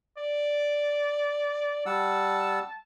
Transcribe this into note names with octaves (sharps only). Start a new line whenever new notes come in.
D5
G3 F#5 A5 E6